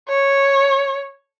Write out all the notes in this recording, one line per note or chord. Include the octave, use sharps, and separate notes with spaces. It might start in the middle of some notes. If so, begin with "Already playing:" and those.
C#5